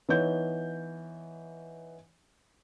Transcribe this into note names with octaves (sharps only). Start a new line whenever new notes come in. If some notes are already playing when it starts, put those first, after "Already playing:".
E3 B3 D#4 C#5 G6